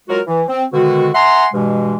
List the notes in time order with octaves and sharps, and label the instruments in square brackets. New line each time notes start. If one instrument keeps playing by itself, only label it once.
[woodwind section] F#3 G#3 F4 F#4 A#4
E3
C4
B2 D3 D#3 G#3 F#4
E5 F#5 G#5 A#5 C6
G2 B2 E3 G#3